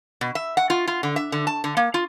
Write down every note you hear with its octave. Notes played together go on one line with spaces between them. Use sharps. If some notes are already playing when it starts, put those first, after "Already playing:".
B2
E5
F#5
F4
F4
D3
E5
D3
A5
D3
A#3
F4